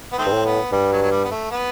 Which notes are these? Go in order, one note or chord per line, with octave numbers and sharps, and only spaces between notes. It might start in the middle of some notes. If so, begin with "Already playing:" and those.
B3
D#3 A3 C4
G2
A2
B3
G2 G3
F#3
F#3
G3
B3
A3
B3